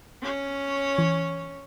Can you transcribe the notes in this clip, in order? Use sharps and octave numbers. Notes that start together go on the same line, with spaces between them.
C#4 C#5
E3